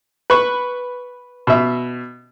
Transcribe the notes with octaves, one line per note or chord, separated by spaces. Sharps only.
B4 C#6
B2 E5